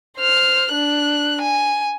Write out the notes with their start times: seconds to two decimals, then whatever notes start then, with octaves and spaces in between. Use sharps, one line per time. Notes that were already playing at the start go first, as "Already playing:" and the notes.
0.17 C5 F6
0.73 D4 F#6
1.41 G#5